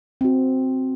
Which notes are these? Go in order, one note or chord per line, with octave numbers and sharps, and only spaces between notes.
C4 F#4